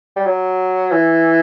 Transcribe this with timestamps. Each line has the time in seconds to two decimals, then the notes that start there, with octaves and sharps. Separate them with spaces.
0.16 G3
0.26 F#3
0.92 E3